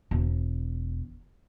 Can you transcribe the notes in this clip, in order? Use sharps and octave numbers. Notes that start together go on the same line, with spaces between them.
E1